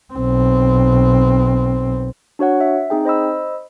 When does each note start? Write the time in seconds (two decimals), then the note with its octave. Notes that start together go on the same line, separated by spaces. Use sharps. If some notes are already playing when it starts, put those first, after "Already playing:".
0.14 B1 C4
2.39 D4 F#4 C#5 F#5
2.61 E5
2.90 C4 D#4 G#4 G5
3.05 C5 D#5 B5 E6